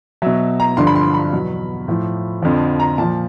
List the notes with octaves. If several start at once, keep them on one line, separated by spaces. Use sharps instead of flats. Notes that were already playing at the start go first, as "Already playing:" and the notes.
B2 F#3 E5
A#5
G2 D3 F3 C6
B5
C6
B5
E2 B2 F#3
A2 F3
F2 D3 F3
A#5
A#2 F3 A5